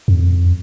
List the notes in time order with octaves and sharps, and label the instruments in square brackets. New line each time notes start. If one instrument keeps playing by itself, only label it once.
[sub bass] F2